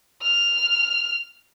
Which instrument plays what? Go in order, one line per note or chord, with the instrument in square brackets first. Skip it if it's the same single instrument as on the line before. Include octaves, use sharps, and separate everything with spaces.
[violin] F6